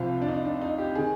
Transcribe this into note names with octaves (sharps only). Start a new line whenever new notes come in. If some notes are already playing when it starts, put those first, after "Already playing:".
Already playing: C2 C3 F3 C4 F4
D4
D#4
D4
D#4
G4
D#3 G#4